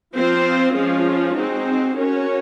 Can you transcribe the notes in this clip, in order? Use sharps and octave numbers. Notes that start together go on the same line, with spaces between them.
F3 C4 F4 C5
F3 G#3 C#4 F4
G#3 C4 D#4 F#4 C5
C#4 F#4 A#4 C#5